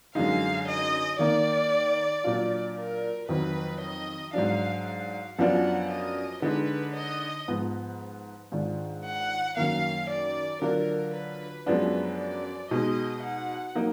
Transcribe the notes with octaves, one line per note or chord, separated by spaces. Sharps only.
F#2 D3 G#3 D#4 F5
D#5
D#3 A#3 D#4 D5
A#2 F#3 D4 F4
A#4
F2 D#3 F#3 B4
D#5
G#2 F#3 D4 F5
F5
F#2 F3 B3 D4 F4 F#5
D#5
D3 G#3 D#4 B4
D#5
G#2 F3 B3
G#2 D#3 G#3 D4 F4
F#5
F#2 D#3 A#3 F5
D5
D3 F#3 D4 F4 A#4
B4
F#2 F3 G#3 B3 D4 B4
D5
B2 G#3 D#4 D#5
F#5
F#3 A#3 D#4